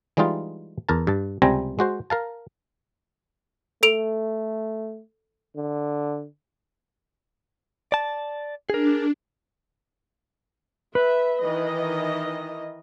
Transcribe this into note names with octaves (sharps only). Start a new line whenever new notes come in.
E3 G3 G#3 D#4 F4
E2 A#4 A5
G2 A5
C#2 C3 G3 C4 G#5 A#5
G#3 F#4 C5
A#4 F5 A5
A3 A4 D7 F7
D3
D5 A5
D4 G#4 A#4
B4 E5
D#3 E3 D#5